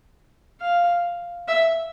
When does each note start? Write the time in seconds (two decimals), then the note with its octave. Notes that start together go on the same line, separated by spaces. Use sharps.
0.61 F5
1.48 E5